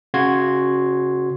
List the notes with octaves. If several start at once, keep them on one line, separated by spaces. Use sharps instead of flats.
C#3 F#4 C6 G#6